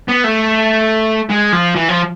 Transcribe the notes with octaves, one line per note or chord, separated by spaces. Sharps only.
B3
A3
G#3
F3
E3
F3